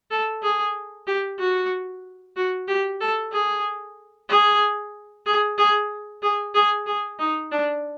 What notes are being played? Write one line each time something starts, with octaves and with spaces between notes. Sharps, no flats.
A4
G#4
G4
F#4
F#4
G4
A4
G#4
G#4
G#4
G#4
G#4
G#4
G#4
D#4
D4